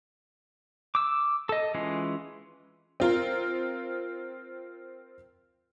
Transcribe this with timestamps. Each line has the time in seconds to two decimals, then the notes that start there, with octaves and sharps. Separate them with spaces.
0.95 D6 E6
1.49 A4 D#5
1.74 E3 G#3 C#4 F4
3.00 C4 F4 A#4